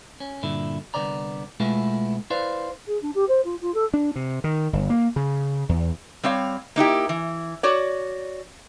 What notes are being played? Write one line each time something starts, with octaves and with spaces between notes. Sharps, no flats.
C#4
G2 A#2 D3 E4
C2 F#2 D3 B3 D5 A#5
B2 G#3 A3 B3 E4 F4
E4 B4 C5 D5 F5
G#4
D4
G4
C5
F4
F4
A4
D4
C3
D#3
G1
A#3
C#3
E2
G3 C4 C#5 F5
A#3 D#4 E4 G4
E3
F#4 C#5 D5